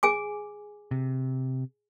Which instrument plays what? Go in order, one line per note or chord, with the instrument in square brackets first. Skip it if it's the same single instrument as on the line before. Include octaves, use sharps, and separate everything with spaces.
[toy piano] G#4 G#5 D6
[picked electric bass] C3